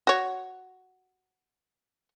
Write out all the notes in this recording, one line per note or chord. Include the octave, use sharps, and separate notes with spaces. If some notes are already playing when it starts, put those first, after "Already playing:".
F#4 C#5